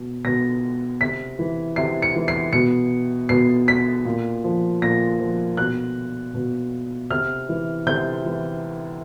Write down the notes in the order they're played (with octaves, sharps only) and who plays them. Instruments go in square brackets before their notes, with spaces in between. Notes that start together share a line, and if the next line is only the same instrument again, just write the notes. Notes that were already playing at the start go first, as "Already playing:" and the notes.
Already playing: [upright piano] B2
B2 A#6
C3 B6
E3
C3 C7
C#7
E3
C7
B2 C#7
B2 C7
B6
A#2
F3
A#2 A#6
F3
B2 F#6
B2
C3 F6
E3
C3 G6
E3